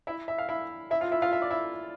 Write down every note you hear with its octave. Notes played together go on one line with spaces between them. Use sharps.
E4 E5
E5
F5
E4 E5
E4 E5
F4 F5
E4 E5
F4 F5
E5
D5
E4 E5